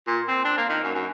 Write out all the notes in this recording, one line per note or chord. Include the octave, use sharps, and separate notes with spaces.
A#2
C4
D4
A#3
D#3
F#2
F#2